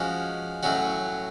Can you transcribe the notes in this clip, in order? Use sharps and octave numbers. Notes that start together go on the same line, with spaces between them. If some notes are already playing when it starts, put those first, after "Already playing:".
Already playing: F3 G#3 C#4 F#4
A2 F#3 C#4 F#4